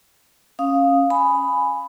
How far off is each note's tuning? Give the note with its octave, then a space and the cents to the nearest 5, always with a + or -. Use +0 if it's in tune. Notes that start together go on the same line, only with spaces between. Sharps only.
C#4 -15 F5 +5 D#6 +0
G#5 +0 B5 +5